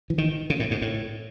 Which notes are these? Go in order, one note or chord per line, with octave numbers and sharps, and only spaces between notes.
E3
D#3
C#3
A2
G#2
A2